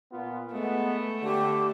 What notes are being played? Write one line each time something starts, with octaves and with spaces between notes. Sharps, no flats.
A#2 B3 F4
G#3 A3 B3
D3 G4